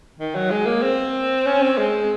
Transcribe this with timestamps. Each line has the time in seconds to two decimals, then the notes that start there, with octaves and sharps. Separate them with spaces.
0.19 D#3
0.35 F#3
0.51 G#3
0.66 A#3
0.82 C4
1.46 C#4
1.62 C4
1.78 G#3